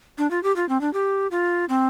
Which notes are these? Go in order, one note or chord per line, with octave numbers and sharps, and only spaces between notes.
D4
F4
G4
F4
C4
D4
G4
F4
C4